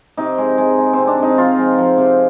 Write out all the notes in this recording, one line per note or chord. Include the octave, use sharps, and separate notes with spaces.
C3 D#4
G#3
G#3
G#3
C3 C4
D4
G#3 D#4
F3 F4
G#3
F3
C3